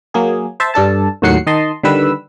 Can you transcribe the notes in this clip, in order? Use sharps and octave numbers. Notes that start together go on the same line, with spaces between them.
F#3 A#3 G#4
C5 E5 A5
G2 D4 A4 A5
D#2 A2 F#3 F#5 C7 C#7
D#3 D#5 A5 C6
D3 D#3 G3 B4 E6